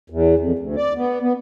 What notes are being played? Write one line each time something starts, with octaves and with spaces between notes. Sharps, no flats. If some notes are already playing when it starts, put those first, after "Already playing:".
E2
F2
D2
D5
B3
B3